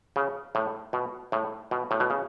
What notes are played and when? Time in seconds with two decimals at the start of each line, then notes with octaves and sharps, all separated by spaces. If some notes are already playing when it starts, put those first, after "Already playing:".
0.16 C#3
0.55 A2
0.93 B2
1.32 A2
1.71 B2
1.91 A2
2.00 B2
2.10 C#3